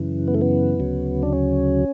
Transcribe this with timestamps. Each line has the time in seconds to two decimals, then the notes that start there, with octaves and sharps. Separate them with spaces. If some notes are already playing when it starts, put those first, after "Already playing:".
Already playing: F#2 C#3 E3
0.28 B3
0.34 A3
0.41 B3
0.80 D2 C#3 F#3
1.23 D4
1.33 C#4